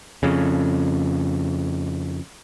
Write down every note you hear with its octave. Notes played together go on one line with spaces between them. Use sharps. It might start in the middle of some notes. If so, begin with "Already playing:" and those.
F2 C#3